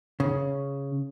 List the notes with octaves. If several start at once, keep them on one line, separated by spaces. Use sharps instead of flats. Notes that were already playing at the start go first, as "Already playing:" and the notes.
C#3